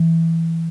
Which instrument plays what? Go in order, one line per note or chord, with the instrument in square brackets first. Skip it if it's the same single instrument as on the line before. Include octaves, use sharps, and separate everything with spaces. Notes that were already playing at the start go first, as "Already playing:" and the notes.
Already playing: [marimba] E3